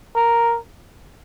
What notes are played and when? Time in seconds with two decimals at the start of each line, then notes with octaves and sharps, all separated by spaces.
0.16 A#4